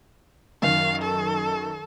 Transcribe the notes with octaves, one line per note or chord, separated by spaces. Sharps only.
F#2 D#3 F5
A4